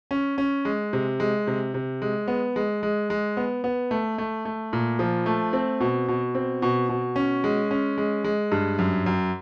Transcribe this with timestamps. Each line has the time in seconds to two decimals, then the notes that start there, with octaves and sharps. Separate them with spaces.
0.11 C#4
0.38 C#4
0.65 G#3
0.93 C3
1.20 G#3
1.47 C3
1.74 C3
2.02 G#3
2.28 B3
2.56 G#3
2.83 G#3
3.10 G#3
3.37 B3
3.64 B3
3.91 A3
4.18 A3
4.45 A3
4.73 A#2
4.99 F3
5.26 A3
5.53 C4
5.81 B2
6.08 B2
6.35 C4
6.62 B2
6.89 B2
7.16 C#4
7.44 G#3
7.71 C#4
7.98 G#3
8.24 G#3
8.52 G2
8.79 F#2
9.06 F#2